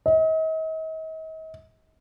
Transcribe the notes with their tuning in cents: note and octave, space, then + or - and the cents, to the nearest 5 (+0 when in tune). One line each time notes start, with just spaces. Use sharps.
D#5 +40